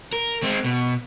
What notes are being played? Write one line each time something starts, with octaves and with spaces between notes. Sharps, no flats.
A#4
G#3 C4
B2